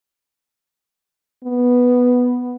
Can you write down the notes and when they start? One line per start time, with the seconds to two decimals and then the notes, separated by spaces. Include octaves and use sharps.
1.44 B3